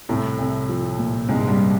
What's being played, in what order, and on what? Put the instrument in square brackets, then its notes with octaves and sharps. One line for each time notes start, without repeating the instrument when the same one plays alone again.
[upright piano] C2 [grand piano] A2 A3
[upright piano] C2
F3
A#2
[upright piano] C2 [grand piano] G#2 G#3
[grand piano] G2 G3